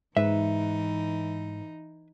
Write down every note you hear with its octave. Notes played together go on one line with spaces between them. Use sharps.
G#2 E3 D#4 B4 E5